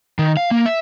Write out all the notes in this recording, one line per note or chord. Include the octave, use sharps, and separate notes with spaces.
D#3
F5
A#3
E5